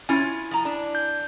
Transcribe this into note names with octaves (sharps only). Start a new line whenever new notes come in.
C#4 E4 F4 G#5
F3 A#5
D4
G6